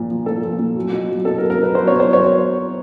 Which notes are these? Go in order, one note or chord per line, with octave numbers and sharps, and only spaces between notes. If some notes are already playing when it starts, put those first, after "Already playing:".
Already playing: A#2 F3
F3
A#2 A4
F3
A#2
F#3
B2
F#3
B2 A4
A#4
F#3
A#4
B2 B4
F#3 C5
B2 C#5
C5
F#3
C#5